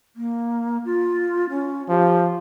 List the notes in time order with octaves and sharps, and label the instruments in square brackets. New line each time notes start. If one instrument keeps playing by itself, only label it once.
[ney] A#3
F4
C#4
[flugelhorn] F3 [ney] G4